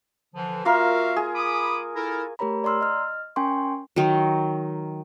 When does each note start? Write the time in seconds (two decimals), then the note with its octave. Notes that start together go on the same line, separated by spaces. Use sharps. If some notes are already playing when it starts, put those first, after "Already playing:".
0.34 D3 E3 F3
0.65 A#3 F4 F#4 A#4 E5 F5
1.17 G#4
1.35 B5 D6 D#6
1.96 E4 A4 A#4
2.39 A3 G4 A#4 C#5 A#5 B5
2.64 D5 A#5 C6 E6 F6
2.81 D#5 F6
3.36 C#4 A#4 G5 G#5 C6 C#6
3.96 D#3 F#3